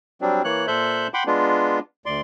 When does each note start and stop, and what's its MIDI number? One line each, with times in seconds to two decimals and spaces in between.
0.21 0.42 54
0.21 0.42 55
0.21 0.42 60
0.21 0.42 62
0.44 0.67 52
0.44 0.67 58
0.44 0.67 73
0.44 0.67 90
0.67 1.07 46
0.67 1.07 69
0.67 1.07 72
0.67 1.07 76
0.67 1.07 90
0.67 1.07 91
1.14 1.23 78
1.14 1.23 79
1.14 1.23 83
1.14 1.23 84
1.14 1.23 86
1.27 1.79 56
1.27 1.79 59
1.27 1.79 62
1.27 1.79 65
2.06 2.21 38
2.06 2.21 74
2.06 2.21 84